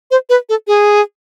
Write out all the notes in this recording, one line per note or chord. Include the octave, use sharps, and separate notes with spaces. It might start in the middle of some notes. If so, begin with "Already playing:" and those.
C5
B4
A4
G#4